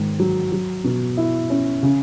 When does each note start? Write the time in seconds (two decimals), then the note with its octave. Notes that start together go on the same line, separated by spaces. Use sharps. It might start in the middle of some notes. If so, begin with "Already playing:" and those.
Already playing: G#2 D#3
0.20 F#3
0.52 F#3
0.84 B2
1.17 E4
1.50 C#4
1.83 C#3